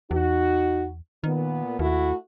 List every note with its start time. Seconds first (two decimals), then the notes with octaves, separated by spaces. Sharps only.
0.11 E2 D#4 F#4
1.24 A#2 D#3 B3
1.79 D#2 A3 E4 F#4